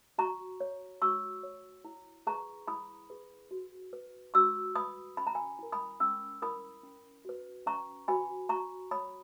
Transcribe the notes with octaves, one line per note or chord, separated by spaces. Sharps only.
F#4 A#5 C#6
C#5
F#4 C#6 E6
C#5
E4
G#4 B4 A#5 C#6
E4 B5 D#6
G#4 B4
F#4
B4
F#4 C#6 E6
B4 B5 D#6
C#4 B5
A#5
G#5 B5
E4 A#4
B5 D#6
C#4 C#6 E6
E4 A#4 B5 D#6
C#4
F#4 B4
C#4 A#5 C#6
F#4 B4 G#5 B5
F#4 A#5 C#6
C#5 B5 D#6